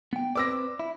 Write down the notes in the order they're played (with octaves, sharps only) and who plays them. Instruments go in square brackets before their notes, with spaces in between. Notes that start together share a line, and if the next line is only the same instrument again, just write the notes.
[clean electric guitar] B3 G5
[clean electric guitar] C4 B4 D5 [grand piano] D6 E6 A#6
[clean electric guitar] E4